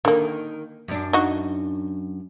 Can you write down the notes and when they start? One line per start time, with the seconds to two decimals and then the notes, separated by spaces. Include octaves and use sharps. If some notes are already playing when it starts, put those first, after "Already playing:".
0.05 D3 D#3 A#3
0.88 F#2 D4
1.13 D#4 F#4